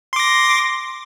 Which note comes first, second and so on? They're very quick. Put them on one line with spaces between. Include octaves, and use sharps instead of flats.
C6 D6 A#6